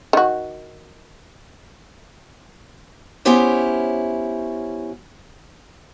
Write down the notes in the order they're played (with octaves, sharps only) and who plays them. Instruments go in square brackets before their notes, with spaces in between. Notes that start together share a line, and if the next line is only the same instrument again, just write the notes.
[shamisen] D#3 F#4
[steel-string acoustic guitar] B3 C#4 E4 G4 C5 C#5